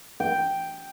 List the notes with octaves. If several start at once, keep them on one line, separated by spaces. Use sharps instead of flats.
G5